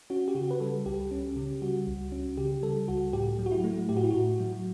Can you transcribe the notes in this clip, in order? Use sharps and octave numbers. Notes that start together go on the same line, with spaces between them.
C#4 F#4
G4
C#3 F#4
B4
G3 A4
C#2 G4
C#4
C#3
G3 F#4
C#2
C#4
C#3 G4
G3 A4
C#2 F#4
A2 G4
F#3
F#4
E4
A3
A2 G4
F#4
E4
A2 F#4
F#3